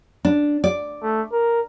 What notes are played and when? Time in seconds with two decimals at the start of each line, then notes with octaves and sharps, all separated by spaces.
0.25 D4
0.64 D5
1.03 A3
1.32 A#4